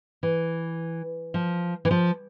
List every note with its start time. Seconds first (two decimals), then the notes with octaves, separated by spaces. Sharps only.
0.23 E3
1.34 F3
1.85 E3
1.91 F3